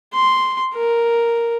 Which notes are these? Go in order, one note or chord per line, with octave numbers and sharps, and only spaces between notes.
C6
A#4